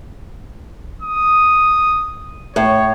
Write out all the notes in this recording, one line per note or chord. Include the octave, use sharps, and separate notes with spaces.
D#6
A2 C#5